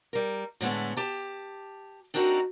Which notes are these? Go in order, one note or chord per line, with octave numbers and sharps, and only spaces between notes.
G3 A#4
A2 D3 G#3 A3 B3
G4 A5
C4 D4 D#4 F#4 A4 A#4